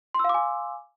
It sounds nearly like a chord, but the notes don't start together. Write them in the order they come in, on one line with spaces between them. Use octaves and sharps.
C6 E6 F5 D6 G#5